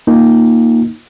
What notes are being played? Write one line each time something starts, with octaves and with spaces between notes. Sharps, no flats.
A#3 D#4 F4